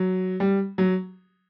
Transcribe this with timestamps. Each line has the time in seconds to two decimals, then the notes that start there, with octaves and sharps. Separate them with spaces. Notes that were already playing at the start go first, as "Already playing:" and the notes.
Already playing: F#3
0.40 G3
0.78 F#3